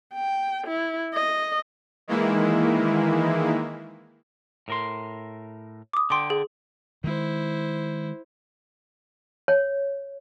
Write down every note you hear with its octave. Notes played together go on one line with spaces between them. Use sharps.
G5
E4
D#5
D#3 E3 G#3 A#3 E4
A2 A#4 C6
D6 D#6
D3 G5 C6 D6
G#4
D#3 G#3 E4 C5
C#5